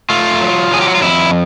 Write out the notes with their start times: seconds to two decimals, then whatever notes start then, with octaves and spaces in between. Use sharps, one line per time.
0.10 A3 F4
0.41 F#3
0.71 F#3 G#4
0.81 G4
0.88 F#4
0.95 F4
1.02 F2 E4